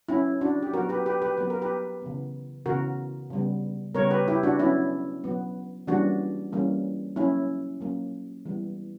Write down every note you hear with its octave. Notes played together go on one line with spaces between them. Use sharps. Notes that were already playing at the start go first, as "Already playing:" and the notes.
F#3 C#4 E4
D4 F#4
G4
F#3 B3 F#4 A#4
G4 B4
G4 B4
G4 B4
F#3 B3 B4
A#4
G4 B4
C#3 E3 B3
C#3 E3 B3 F#4 A#4
C#3 G3 B3
C#3 G3 B3 A#4 C#5
G4 B4
E4 G4
D4 F#4
F#3 B3 C#4 E4
F#3 B3
E3 G3 A#3 C#4 D4 F#4
E3 G3 A#3 C#4
F#3 A#3 C#4 E4
F#3 A#3 C#4
E3 G3 B3